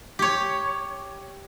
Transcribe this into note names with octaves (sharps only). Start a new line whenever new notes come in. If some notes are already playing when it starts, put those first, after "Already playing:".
G4 C#5